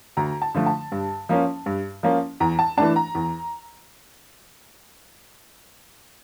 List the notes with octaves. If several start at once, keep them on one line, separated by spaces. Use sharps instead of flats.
D2 A#5
A5
D3 F3 A3
A5
G2
F3 A#3 C#4
G2
F3 A#3 C#4
E2 A#5
A5
E3 A3 D4 A5
A#5
E2